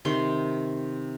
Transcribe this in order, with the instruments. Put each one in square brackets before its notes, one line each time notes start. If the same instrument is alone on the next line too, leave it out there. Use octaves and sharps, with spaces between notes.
[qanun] C3 D#3 C6